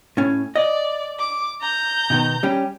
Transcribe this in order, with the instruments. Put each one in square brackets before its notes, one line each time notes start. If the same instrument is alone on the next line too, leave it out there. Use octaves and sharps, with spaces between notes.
[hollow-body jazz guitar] A2 C#4
[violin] D5 [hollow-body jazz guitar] D#5
[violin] D6
A#5 G6
[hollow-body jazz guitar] B2 D#3 B3
G3 C#4 G4